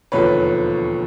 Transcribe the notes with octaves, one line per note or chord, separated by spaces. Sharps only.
E1 D#2 D3 F3 B4 C#5